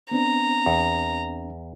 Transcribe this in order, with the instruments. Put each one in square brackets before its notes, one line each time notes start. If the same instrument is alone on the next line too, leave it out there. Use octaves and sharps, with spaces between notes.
[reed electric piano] B3 C4 D4 [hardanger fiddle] A#5
[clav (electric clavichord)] E2